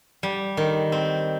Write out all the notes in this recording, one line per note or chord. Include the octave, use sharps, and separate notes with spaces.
G3
D#3
C4